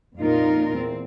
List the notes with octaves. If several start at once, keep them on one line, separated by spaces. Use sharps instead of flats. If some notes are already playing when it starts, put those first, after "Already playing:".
F2 A#2 D#4 F4 A#4
E2 C4